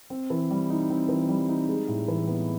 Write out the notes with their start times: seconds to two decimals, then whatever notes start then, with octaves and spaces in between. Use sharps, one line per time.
0.10 C4
0.30 E3
0.51 G3
0.70 D#4
0.90 C4
1.09 E3
1.29 G3
1.49 D#4
1.69 G#3
1.88 A2
2.08 E3
2.28 B3